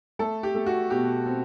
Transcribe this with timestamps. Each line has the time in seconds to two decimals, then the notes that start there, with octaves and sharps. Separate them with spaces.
0.19 A3 A4
0.43 G4
0.55 A3
0.66 F#4
0.90 B2 G4
1.26 C4